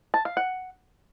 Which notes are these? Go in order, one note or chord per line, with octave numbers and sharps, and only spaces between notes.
A5
F5
F#5